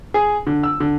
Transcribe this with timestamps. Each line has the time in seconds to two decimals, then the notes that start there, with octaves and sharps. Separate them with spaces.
0.14 G#4
0.47 D3
0.63 E6
0.80 D3